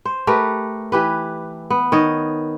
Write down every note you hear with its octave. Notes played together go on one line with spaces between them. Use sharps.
C5
A3 G4 A#4 B4
E3 G4 B4
B3
D#3 C#5 D#5